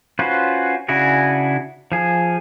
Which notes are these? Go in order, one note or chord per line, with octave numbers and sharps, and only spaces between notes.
C#4 F4 F#4 B4 C5
C#3 D4 E4 F#4 G#4
F3 G#4